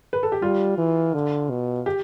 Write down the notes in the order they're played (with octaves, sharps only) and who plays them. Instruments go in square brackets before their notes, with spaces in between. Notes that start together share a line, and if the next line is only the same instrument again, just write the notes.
[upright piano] B4
A4
G4
[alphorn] G3 [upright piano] F4
[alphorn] E3
D3
B2
[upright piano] G4